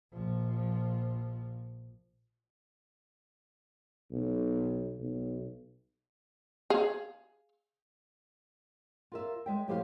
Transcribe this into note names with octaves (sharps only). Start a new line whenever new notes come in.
A#1 F3
B1
B1
G#4 F5
F4 A#4 E5
G#3 E5 G5
A2 F3 G4 B4 F5